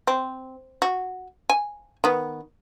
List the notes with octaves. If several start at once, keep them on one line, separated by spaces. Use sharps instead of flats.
C4
F#4
G#5
D#3 B3